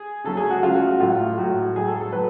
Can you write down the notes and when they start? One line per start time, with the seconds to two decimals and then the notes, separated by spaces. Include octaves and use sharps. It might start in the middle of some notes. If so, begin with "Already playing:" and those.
Already playing: G#4
0.24 C#3 F#3 A3 C#4 A4
0.37 G#4
0.51 F#4
0.63 C#3 F#3 A3 C#4 F4
0.75 F#4
0.87 F#4
1.00 A2 F#3 A3 F4
1.38 A2 F#3 A3 F#4
1.76 A2 F#3 A3 G#4
1.88 A4
2.01 A4
2.13 F#3 A3 B4